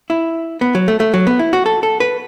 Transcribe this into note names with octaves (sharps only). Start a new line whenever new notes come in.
E4
B3
F#3
A3
A3
F#3
B3
E4
F#4
A4
A4
B4